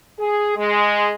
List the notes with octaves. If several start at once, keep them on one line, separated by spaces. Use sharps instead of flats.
G#4
G#3